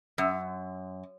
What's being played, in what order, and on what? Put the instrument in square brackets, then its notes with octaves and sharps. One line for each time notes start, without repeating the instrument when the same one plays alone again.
[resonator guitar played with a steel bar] F#2